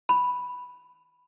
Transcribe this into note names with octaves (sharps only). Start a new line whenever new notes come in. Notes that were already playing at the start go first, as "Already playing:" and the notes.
B5